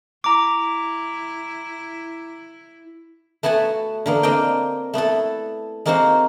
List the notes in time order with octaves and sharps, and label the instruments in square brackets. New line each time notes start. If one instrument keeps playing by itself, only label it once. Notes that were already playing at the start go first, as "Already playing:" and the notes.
[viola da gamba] E4 [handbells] A#5 D6
[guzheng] A3 B3 F#4 G#5 A5
D3 A#3 B3
A#3 C4 D4 D#5 G5
A3 B3 E4 A4
G#3 A#3 C4 D#4 F#4 C5